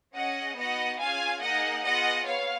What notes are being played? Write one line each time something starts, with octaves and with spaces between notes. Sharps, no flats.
C#4 G#4 D#5 F#5
B3 D#4 F#4 D#5 F#5
C#4 F4 G#4 F5 G#5
A#3 D#4 G#4 D#5 F#5
B3 F4 G#4 D#5 F#5
B3 C#5 F5